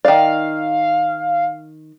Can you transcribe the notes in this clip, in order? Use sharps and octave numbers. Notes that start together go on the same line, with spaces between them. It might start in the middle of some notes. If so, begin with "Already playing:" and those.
D#3 D5 F5